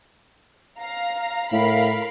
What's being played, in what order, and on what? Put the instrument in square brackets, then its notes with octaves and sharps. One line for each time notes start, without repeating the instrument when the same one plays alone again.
[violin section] F5 A#5
[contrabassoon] A2 [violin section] A#4 F5 B5